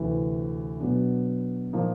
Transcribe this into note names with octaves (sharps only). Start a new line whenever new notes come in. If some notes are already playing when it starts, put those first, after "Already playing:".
Already playing: D2 C3 E3
B2 F#3 B3 D4
A#2 F3 A#3 D#4